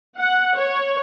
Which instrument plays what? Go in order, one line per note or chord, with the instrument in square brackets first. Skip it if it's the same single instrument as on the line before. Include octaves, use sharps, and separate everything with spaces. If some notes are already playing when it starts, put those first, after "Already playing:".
[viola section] F#5
C#5